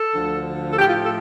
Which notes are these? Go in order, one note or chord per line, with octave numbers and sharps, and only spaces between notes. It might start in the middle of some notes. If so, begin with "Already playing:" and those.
Already playing: A4
D2 D3 F3
A4
A2 F3 G4
F4
A4